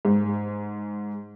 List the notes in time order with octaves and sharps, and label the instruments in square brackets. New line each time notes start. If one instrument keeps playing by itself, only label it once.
[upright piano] G#2